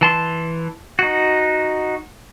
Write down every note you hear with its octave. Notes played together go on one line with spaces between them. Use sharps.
E3 A5 C6
D#4 F#4